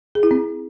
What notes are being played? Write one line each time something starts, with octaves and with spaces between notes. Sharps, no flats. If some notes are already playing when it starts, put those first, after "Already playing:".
G#4
E4
C4